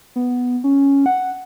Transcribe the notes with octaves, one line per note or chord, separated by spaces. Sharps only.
B3
C#4
F#5